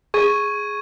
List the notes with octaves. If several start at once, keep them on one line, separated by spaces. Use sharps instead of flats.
G#4 C#6 G#6 D#7